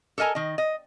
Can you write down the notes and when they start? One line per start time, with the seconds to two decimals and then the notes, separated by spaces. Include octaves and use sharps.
0.18 A4 A#4 D#5 G#5 A#5
0.35 D#3 D#5
0.58 D#5